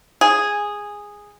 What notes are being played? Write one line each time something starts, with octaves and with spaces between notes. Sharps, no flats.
G#4